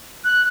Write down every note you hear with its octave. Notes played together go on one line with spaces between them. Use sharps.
F#6